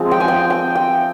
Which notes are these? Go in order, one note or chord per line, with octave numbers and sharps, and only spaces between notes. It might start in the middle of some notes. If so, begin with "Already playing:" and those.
Already playing: F3 G#3 C4
G5
G#5
G5
G5
G5